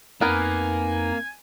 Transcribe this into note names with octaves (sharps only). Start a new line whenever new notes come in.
F2 A#3 B3 D#4 A#4 G#5